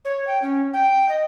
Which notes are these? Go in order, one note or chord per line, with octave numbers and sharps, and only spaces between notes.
C#5
G5
C#4
G5
D#5